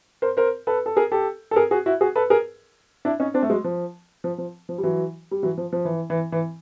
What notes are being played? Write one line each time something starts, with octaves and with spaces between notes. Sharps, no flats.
A#4 C5
A#4 C5
A4 B4
A4
G#4 A#4
G4 A4
A4
G#4 A#4
F#4 G#4
E4 F#4
F#4 G#4
A4 B4
G#4 A#4
D4 E4
C#4 D#4
C4 D4
A3
F#3 G#3
F3
F3
F3
F3
G3
E3 F#3
G3
E3 F#3
F3
F3
E3
E3
E3